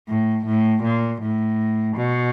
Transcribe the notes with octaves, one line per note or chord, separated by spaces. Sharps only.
A2
A2
A#2
A2
B2